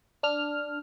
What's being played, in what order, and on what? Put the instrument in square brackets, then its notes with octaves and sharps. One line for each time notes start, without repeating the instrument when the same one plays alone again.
[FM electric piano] D4 F6